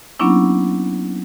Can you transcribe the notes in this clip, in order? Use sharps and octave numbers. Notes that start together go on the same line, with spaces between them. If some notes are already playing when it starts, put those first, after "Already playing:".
F#3 A#3 B3 C#4 D4 E4